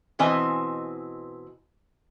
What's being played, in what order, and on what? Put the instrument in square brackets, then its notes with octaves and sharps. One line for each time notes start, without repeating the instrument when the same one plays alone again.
[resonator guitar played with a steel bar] B2 E3 C4 D#5 G#5